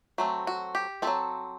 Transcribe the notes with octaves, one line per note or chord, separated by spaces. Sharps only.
F#3 A3 C4
F#4
G4
A3 C4 A4
F#3